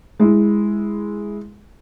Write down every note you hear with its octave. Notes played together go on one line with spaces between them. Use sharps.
G#3 E4